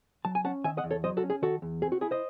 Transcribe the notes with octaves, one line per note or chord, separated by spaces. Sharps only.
F#3 A5
G#5
C#4 F#5 A5
D#3 E5 G#5
D#5 F#5
E2
A4 C#5
F#3 C5 D#5
F#4 A4
C#4
G#4
D#3 F#4 A4
E2
C4 G#4
F#4
E4 G#4
C5 D#5